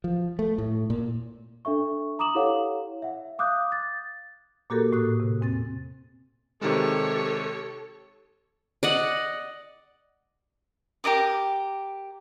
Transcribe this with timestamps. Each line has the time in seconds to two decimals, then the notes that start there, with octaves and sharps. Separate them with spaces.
0.04 F3
0.39 A3
0.58 A2
0.90 A#2
1.65 D4 A4 E5 C#6
2.19 A#5 D6 D#6 E7 F#7
2.35 E4 G4 A4 C#5 F5 F#5
3.02 E5 F#5
3.39 F5 D6 D#6 F#6 G6
3.72 A6
4.70 A#2 A#3 F#4 G4 A4 A#4
4.92 A2 D#6 F#6
5.20 C3
5.41 E2 C4 A6
6.61 C3 D#3 G#3 G4 A4 C#5
8.83 D5 D#5 F#5
11.04 G4 A#4 D#5 D6